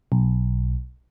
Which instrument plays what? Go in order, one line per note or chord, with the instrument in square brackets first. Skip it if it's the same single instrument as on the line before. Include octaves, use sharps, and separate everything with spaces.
[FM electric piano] B1